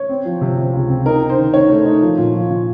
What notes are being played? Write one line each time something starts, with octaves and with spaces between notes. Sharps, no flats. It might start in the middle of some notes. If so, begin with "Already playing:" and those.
Already playing: C#5
C4
F3
C3
C3
C#2
C4
D#4 A#4
D#4
C5
D#3
D#3 C#5
A3
D#4
F3
A#2
F3
A#2